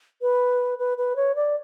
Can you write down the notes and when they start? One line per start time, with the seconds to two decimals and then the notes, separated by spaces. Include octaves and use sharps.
0.22 B4
0.79 B4
0.98 B4
1.16 C#5
1.35 D5